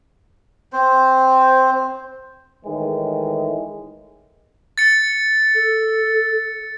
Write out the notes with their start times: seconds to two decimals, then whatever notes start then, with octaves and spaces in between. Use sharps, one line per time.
0.73 C4 C5
2.66 A2 D#3 E3 G#3
4.78 A6 C#7
5.54 A4